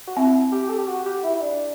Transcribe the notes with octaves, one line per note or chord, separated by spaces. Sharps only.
F#4
C4 E4
G4
A4
G4
F#4
G4
E4
E4
D4